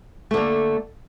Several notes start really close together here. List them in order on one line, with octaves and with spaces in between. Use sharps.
A3 D3 A#3